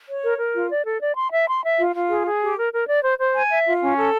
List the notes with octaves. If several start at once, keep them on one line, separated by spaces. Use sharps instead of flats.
C#5
A#4
A#4
F4
D5
A4
D5
C6
E5
C6
E5
F4
F4
G#4
G#4
G4
A#4
A#4
D5
C5
C5
G#5
E5
F4
C#4
A4